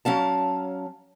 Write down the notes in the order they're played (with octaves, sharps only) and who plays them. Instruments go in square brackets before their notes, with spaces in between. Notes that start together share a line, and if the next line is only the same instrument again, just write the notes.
[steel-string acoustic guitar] F#3 C#4 F5 A5